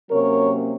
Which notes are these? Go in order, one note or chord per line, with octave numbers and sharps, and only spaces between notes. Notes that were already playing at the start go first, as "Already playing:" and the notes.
C3 F#3 A#3 C#4 A#4 C#5